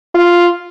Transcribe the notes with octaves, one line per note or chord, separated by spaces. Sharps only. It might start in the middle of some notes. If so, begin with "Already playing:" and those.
F4